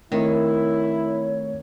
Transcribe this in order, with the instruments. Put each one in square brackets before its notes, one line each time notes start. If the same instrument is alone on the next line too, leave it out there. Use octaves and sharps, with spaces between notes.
[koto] D#3 [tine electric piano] A3 C4 [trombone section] E4 [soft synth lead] C#5